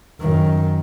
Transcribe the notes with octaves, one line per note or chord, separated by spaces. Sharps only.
F#2 D#3